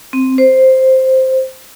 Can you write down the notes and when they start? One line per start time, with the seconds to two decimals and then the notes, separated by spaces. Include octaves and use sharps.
0.13 C4
0.38 C5